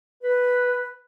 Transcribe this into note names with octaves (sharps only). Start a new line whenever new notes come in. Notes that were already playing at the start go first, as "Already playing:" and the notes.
B4